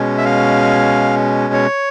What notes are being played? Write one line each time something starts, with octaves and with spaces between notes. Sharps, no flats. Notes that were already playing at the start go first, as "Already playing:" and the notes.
Already playing: B2 G#3 C#4
E5
F5
C#5